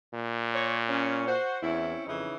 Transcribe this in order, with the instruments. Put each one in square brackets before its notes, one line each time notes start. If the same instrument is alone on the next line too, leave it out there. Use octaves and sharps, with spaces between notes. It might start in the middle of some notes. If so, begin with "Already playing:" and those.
[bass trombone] A#2
[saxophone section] A#4 C#5
C#4
F#4 C5
[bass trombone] E2 [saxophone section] C4 C#4 E4
[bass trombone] F2 [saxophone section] C#3 E3 D#4